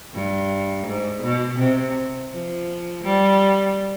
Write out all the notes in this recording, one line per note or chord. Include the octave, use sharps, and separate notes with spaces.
G2
G#2
B2
C3
F3
G3